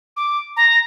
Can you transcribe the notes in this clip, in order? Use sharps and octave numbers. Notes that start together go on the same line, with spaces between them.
D6
A#5